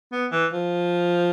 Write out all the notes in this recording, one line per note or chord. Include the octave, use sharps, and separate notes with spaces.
B3
E3
F3